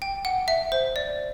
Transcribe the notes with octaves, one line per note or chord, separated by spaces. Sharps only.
G5
F#5
E5
C5
D5